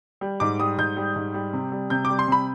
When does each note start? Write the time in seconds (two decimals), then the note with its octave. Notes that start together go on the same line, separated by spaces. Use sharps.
0.21 G3
0.40 G#2 D6
0.60 G3 D#6
0.78 G#2 G6
0.97 G3
1.16 G#2
1.34 G3
1.53 C3
1.72 G3
1.90 C3 G6
2.05 G3 D6
2.19 C6
2.28 C3 B5